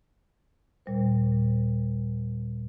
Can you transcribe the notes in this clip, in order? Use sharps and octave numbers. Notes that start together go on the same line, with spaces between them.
D#2 A#2 G3 C5